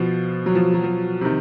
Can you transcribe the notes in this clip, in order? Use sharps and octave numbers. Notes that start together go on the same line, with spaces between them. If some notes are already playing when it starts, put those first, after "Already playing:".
Already playing: B2 F3
F#3
F3
F#3
F3
C3 D#3